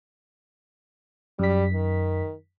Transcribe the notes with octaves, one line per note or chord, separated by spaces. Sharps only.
F#2 G3 B6
D#3